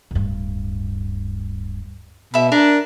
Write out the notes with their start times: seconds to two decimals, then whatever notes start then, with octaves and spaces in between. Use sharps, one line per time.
0.11 D1 G2
2.34 B2 E5 B5
2.52 D4 A#4